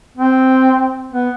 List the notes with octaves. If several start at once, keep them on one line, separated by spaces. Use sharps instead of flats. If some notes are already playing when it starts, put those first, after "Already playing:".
C4
B3